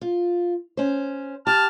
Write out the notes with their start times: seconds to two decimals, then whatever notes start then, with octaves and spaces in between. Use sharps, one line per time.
0.01 F4
0.77 C#4 C5
1.47 G4 A5 F6